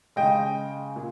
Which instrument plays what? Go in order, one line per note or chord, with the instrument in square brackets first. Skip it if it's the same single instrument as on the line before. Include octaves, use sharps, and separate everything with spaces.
[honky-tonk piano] C#3 G#3 D#5 G5
A#2